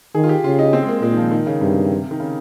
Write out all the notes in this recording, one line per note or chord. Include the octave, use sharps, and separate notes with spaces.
D#3 G#4
F4
G4
C#3 F4
D#4
C4
G#3
A#3
A#3
A#2 G#3
D#3
F3
D#3
C#3
G2 C3
D#3
C#3